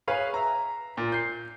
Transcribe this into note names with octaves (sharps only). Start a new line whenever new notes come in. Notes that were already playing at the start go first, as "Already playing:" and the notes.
G#4 B4 C#5 F5
E5 A#5
A#2
G6 C7